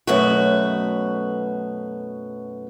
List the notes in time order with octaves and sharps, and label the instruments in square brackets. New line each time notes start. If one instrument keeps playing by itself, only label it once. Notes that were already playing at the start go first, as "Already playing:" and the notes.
[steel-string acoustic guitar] F#2 B2 A3 F#4